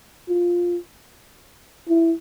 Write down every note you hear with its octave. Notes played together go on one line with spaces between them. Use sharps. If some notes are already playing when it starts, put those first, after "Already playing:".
F4
E4